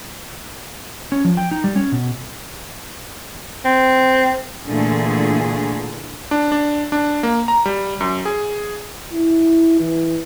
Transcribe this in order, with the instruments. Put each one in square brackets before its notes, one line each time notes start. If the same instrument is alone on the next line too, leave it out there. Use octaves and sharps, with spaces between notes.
[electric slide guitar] C#4
F3
G5
D#4
G3
C#4
B2
[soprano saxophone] C4
[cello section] A#2 D3 E3 A3 G#4
[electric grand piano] D4
D4
D4
A#3
A#5
G3
F#2
G#4
[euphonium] E4
E3